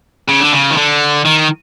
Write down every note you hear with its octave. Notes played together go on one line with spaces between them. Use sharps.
C#3
D3
C#3
D#3
D3
D#3